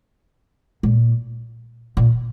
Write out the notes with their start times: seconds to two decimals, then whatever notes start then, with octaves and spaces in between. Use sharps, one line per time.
0.83 A#2
1.97 A#2